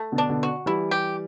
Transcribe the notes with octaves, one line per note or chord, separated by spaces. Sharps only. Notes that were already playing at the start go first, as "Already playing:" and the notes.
Already playing: A3
B2 D3
D4
B2 D3
F#4
E3 G3 E4
G4